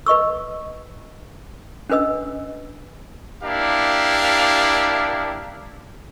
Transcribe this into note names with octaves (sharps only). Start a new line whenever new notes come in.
B4 D#5 C#6 E6
C#4 D4 B4 D#5 E6
A#3 D4 E4 G4 F5